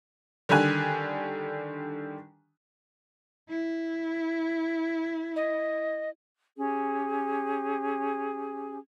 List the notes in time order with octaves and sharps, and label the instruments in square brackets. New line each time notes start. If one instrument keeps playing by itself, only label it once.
[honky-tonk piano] D3 D#3 G3 D4 G#5 F#6
[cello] E4
[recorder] D#5
[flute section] C#4 G4 G#4